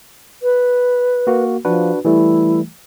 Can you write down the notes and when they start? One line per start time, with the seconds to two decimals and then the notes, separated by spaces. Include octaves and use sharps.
0.43 B4
1.27 A#3 F#4
1.65 F3 D4 F#4 B4
2.05 E3 G3 A3 E4